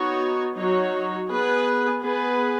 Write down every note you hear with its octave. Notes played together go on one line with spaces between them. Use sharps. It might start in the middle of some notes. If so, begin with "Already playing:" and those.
Already playing: B3 D#4 F#4 C#5
F#3 D#4 F#4 C#5
B3 G#4 B4
B3 G#4 B4